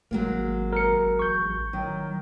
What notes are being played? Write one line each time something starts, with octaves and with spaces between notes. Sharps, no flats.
G#1 F#3 G#3 A#3
A#4 C#7
A1 C#6 G6
D#3 F#3